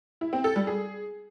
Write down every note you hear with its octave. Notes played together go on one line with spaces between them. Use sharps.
E4
C4
A4
G3
G#4